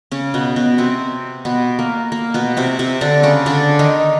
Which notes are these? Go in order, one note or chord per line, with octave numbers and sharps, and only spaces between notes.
C#3 C#4
B2 B3
B2 B3
C3 C4
B2 B3
A#3
A#3
B2 B3
C3 C4
C3 C4
D3 D4
C#3 C#4
D3 D4
D#3 D#4